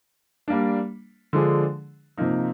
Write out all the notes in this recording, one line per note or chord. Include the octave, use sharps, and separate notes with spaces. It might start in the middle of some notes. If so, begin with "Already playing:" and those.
G3 A#3 D4
D3 F3 G#3 D4 G#4
C3 F3 A#3 D#4